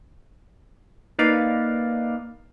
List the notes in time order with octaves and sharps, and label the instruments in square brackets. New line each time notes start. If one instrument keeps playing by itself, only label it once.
[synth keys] A#3 D#4 B4 D5 D#5 F5